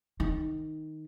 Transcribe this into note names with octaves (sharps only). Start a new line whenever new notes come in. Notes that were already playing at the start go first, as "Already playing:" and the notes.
D#3